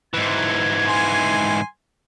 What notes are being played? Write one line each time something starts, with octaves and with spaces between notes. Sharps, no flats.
G#2 E3 G#6
G#5 C6